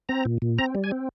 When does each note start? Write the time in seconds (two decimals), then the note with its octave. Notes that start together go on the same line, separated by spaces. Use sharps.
0.09 C4 A#5
0.25 A#2
0.42 A#2
0.58 C4 A#5
0.75 G3
0.84 G#5
0.91 C4